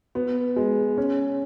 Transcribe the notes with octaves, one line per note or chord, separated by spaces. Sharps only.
B3
G#3
C#4